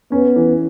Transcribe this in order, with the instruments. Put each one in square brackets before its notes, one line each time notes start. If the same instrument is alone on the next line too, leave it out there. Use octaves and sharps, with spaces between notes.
[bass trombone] B3 [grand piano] C#4
[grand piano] E3